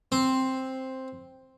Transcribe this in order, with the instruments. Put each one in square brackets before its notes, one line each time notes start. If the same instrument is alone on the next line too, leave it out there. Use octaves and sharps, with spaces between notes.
[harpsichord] C4